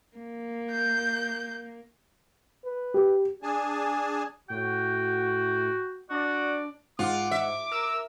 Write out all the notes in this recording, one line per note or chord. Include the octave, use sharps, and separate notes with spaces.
A#3
G6
B4
G4
D4 G#4 G#5 A5
A2 F#4 G5
D4 F#4 D5
G#2 F4 F#5 D6
E5
A#4 E6